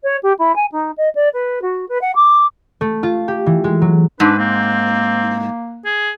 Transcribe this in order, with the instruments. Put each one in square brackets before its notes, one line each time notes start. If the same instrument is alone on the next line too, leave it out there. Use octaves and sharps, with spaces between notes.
[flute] C#5
G4
E4
G#5
D#4
D#5
D5
B4
F#4
B4
F#5
D6
[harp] A3
F4
G4
E3
G#3
F#3
[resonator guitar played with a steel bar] G#2 [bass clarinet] D4 [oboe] B4
[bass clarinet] A#3 [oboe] C4
[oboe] G#4